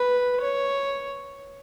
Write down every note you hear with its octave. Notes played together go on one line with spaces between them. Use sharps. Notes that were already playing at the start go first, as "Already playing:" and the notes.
Already playing: B4
C#5